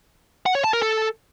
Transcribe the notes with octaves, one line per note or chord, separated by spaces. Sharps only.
F#5
C#5
A5
A#4
A4